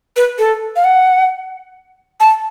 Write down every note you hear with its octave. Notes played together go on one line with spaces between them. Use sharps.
B4
A4
F5
F#5
A5